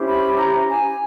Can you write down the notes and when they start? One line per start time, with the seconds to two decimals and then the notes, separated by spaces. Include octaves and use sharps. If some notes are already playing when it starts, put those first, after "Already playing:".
Already playing: C#4 E4 G4 C5
0.08 B5
0.38 A#5
0.69 G#5